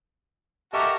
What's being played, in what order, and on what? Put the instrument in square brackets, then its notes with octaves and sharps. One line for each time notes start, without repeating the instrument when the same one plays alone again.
[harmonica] F#4 A4 A#4 [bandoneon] G4 [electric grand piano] D#5 E5 C#6